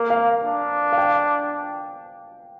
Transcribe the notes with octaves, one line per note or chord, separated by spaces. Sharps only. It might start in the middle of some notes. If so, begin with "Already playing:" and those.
Already playing: A#3 A#4
F5
D4
F5
G5